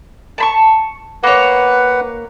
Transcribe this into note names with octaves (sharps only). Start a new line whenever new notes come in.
A5 B5 C#6
A#3 B4 C#5 F#5